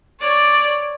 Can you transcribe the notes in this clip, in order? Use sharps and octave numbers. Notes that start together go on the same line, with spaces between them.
C#5 D5